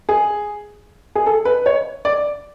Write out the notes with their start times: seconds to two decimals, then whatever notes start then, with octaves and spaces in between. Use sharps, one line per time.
0.09 G#4
1.15 G#4
1.26 A4
1.45 B4
1.66 C#5
2.05 D5